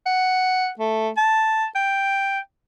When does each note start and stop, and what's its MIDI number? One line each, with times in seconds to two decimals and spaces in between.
0.06 0.69 78
0.79 1.10 57
1.17 1.66 81
1.75 2.39 79